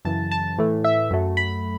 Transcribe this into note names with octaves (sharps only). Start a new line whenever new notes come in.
F#2 C#3 E3 A5
A5
A2 E3 A3
E5
F#2 F#3 A3
B5